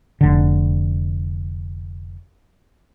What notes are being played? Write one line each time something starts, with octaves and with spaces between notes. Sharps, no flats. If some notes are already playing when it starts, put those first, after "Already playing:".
F1 D3